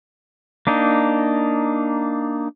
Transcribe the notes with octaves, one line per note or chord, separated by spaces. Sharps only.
A#3 D4 D#4